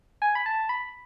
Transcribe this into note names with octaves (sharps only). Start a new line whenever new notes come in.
G#5
B5
A5
B5